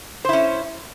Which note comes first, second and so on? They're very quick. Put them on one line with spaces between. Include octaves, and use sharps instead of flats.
C5 E4 C#4